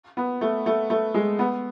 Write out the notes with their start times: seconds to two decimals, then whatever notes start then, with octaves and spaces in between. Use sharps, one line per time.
0.17 B3
0.41 A3
0.66 A3
0.90 A3
1.14 G#3
1.39 B3